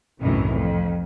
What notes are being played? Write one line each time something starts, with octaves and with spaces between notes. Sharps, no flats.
C2 F#2 A2 D#3 E3
F2